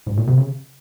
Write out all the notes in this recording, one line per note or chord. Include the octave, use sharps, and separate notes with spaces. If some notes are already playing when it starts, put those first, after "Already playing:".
G#2
A#2
C3
C#3